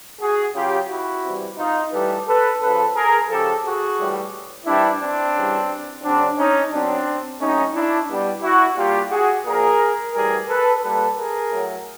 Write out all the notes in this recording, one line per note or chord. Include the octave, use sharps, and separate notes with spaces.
F#4 G#4
C#3 F#3 F4 G4
E4 F#4
C3 E3 G3
D#4 F4
A2 E3 G3 A4 B4
A4 B4
C#3 F3 A4 B4
G#4 A#4
C#3 F3 G4 A4
F#4 G#4
A2 E3 G3
C3 E3 G3 D4 E4
C4 D4
C#3 E3 G3
C#3 F#3 C4 D4
C#4 D#4
B2 F#3 C4 D4
A2 F#3 C#4 D#4
D4 E4
B2 G3
E4 F#4
A#2 G3 F4 G4
F#4 G#4
A#2 F3 G#4 A#4
A2 E3 G3 G#4 A#4
A4 B4
A#2 G3 A4 B4
G#4 A#4
A2 F#3